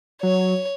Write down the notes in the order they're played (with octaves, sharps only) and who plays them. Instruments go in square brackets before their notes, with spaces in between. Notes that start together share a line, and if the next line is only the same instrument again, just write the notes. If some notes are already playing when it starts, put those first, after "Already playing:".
[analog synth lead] F#3 [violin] C#5